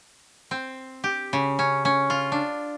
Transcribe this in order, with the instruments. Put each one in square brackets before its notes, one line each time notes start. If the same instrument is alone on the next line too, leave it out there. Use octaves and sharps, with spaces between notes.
[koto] C4
G4
C#3
C#4
C#4
F4
D4